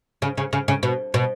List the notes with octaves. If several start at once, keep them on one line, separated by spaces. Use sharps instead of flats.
C#3
C#3
C#3
C#3
B2
B2